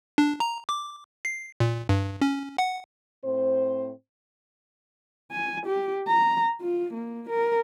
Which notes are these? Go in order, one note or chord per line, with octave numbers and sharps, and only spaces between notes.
D4
A#5
D6
C7
A#2
G2
C#4
F#5
A2 C4 C5
G#5
G4
A#5
F4
A#3
A#4